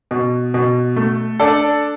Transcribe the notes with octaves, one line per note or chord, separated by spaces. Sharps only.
B2
B2
A3
D4 A4 D5